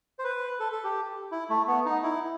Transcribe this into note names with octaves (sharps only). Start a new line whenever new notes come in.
C5
B4
A4
A4
G4
E4
A3
B3
D#4
E4